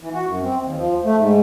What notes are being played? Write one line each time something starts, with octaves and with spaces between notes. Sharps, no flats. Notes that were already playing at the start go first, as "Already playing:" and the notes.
E3
F#4
F#2
C4
D#2
F3
A3
G#2